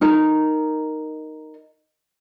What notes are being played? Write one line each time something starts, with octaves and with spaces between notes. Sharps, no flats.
D#4 A#4